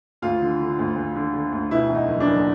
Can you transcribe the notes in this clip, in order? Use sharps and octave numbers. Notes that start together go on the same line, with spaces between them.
D2 F4
D3
D3
D2
D2
D3
D3
D2
B2 E4
E2
D#4
F#1
D4
F#1